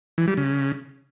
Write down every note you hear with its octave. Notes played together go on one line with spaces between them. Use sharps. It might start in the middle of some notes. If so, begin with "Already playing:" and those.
E3
G3
C#3